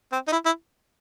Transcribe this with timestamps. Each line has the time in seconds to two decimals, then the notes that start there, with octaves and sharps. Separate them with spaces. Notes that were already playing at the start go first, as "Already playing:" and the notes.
0.12 C4
0.28 D#4
0.32 E4
0.46 E4